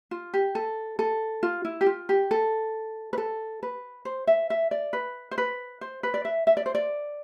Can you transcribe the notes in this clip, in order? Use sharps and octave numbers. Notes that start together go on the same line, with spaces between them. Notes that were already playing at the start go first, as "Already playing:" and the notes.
F4
G4
A4
A4
F4
E4
G4
F4
G4
A4
B4
A4
B4
C5
E5
E5
D5
B4
C5
B4
C5
B4
D5
E5
E5
D5
C5
D5